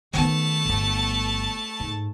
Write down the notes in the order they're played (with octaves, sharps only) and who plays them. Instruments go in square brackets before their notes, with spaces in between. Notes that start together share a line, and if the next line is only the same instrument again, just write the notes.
[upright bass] D#3 B3 [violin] A3 A5
[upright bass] G1 B3
G#2